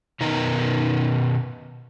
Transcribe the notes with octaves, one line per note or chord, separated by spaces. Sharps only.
B2 D#3 B3 D#4 A#4